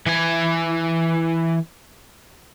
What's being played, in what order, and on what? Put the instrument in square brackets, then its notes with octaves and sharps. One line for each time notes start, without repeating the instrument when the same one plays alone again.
[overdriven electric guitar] E3 G#5